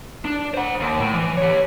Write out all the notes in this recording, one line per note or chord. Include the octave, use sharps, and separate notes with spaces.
D4
C5 F#5
D#2
A2
E3
G4 C#5